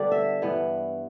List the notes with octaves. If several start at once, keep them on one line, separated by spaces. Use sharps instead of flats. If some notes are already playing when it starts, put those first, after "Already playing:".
Already playing: D3 G3 B3 D5
E5
G2 E3 B3